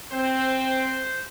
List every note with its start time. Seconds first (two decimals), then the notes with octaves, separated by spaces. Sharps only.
0.12 C4 C5